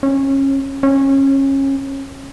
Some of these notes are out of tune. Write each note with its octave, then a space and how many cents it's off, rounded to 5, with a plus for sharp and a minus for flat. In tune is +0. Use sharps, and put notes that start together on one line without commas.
C#4 -25
C#4 -25